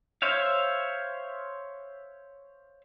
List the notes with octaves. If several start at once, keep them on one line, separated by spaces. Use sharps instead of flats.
C5 C#5 E5 F5